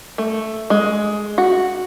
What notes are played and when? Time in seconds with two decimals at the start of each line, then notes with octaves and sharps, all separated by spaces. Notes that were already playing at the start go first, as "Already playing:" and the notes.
0.18 A3
0.70 G#3
1.38 F#4